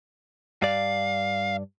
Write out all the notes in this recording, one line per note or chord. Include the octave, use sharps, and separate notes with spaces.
G2 D5 F5